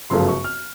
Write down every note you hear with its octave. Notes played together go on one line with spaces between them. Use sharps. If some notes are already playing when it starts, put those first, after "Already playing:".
G1 F#2 C#3 F3 A3 C6
C#6
F6